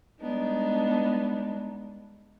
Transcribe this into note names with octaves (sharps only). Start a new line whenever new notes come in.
G3 G#3 B3 D4 D#4